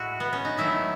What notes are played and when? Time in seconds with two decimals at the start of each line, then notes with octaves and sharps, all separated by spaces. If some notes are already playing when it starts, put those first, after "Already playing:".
Already playing: A2 G#3 E4 F#4
0.20 B3
0.33 C#4
0.45 D#4
0.57 D#3 F#3 A3 E4